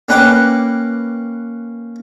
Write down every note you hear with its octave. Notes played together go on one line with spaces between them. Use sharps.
A#3 C#4 B4 F#5 G5 D6